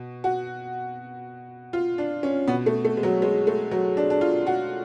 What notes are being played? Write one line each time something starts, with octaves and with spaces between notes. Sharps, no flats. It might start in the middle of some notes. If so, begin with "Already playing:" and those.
Already playing: B2
F#4
F4
D4
C#4
B2 B3
A3
A3
G#3
F#3
G#3
A3
F#3
D4
D4
F4
F#4